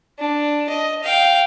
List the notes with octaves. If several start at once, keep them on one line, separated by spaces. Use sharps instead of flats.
D4
D#5
F5 G5